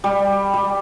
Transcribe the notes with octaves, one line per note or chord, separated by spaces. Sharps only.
G3
G3